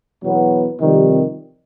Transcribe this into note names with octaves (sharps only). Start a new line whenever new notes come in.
E2 B2 F#3 B3
F2 C3 D#3 G3